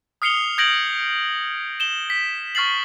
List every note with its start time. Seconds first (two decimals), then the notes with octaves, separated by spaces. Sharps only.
0.22 D#6 F6 C7 C#7 F7 G7
0.58 D#6 G6 G#6 A#6 D7 F#7
1.80 E7 G7
2.10 B6
2.55 C#6 F6 A6 C7 F#7